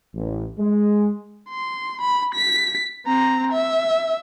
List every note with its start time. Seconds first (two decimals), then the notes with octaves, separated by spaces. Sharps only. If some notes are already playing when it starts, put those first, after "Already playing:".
0.14 A1
0.58 G#3
1.49 C6
2.01 B5
2.35 B6
3.06 C4 A#5
3.53 E5